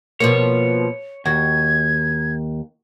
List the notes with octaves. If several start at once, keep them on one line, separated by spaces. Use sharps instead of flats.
B2 F3 A#3 C#5
D#2 F#4 G#6